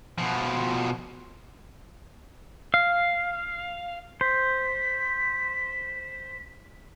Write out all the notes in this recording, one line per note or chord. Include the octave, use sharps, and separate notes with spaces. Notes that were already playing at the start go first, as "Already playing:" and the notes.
B2 F3
F5
C5 B6